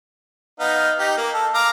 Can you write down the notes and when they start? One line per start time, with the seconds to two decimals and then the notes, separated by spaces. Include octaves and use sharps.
0.60 B3 D#4 F5
0.99 D#4 G4
1.17 A#3
1.34 A4
1.55 F5 A#5 D6